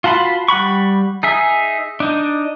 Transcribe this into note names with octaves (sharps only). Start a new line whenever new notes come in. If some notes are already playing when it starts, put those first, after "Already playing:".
F4 F#4 A5 B5 C6
G3 F#5 B5 C#6
D#4 G#4 E5
D4 D#4